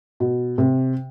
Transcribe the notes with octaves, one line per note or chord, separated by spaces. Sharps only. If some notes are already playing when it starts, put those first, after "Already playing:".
B2
C3